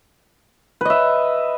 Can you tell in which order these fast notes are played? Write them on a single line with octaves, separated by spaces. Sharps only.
B4 D#5 E5